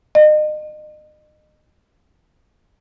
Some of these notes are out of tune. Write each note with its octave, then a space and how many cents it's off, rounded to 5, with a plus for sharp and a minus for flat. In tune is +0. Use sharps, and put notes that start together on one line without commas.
D#5 -35